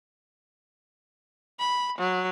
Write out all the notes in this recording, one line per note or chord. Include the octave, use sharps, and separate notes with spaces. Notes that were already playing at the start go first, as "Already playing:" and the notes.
B5
F#3